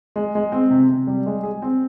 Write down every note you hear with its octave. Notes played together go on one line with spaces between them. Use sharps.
G#3
G#3
C4
C3
C3
G3
G#3
G#4
C4